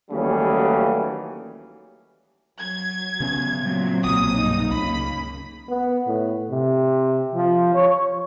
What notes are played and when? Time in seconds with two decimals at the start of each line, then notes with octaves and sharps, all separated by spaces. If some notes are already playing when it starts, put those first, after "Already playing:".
0.11 D#2 C#3 E3 F#3 G3 A3
2.58 F#3 G#6
3.20 C#3 B3 C#4
3.58 A#2 F#3 C4
4.04 B1 A#3 D#6
4.35 G2 D#4
4.72 C#2 C#3 A#3 B5
5.69 B3
6.06 A2
6.50 C3
7.35 F3
7.74 C#5